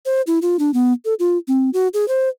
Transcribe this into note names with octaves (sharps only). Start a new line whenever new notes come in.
C5
E4
F4
D4
B3
A4
F4
C4
F#4
G#4
C5